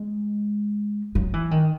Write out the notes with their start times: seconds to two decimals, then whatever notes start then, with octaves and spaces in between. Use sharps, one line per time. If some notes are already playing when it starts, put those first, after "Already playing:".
Already playing: G#3
1.15 F#3
1.34 E3
1.51 D#3